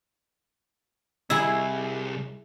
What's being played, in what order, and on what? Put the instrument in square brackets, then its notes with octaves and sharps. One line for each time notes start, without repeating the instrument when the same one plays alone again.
[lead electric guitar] C2 G3 [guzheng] E4 G#4